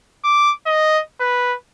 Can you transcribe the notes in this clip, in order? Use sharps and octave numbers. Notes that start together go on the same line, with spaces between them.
D6
D#5
B4